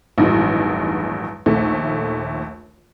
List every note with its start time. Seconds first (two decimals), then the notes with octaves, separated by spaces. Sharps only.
0.18 A1 E2 G2 D#3 F#3 G#3
1.46 A#1 D#2 A3